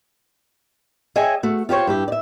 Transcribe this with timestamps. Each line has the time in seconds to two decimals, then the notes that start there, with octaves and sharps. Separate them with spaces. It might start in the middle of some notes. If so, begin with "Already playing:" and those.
1.16 G#4 C#5 D#5 E5 G5 G#5
1.43 A3 F#4
1.69 F4 G4 C5 C#5
1.87 G2 E4 G4
2.08 D5 E5